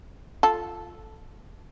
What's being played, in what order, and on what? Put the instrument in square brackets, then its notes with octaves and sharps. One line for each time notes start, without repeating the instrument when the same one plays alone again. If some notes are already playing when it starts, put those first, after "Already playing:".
[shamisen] F4 A4